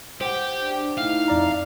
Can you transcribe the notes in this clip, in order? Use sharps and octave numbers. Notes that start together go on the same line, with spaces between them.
G4 C5 F#5
D4
A3 D#4 E4 F5
F2 D5 A#5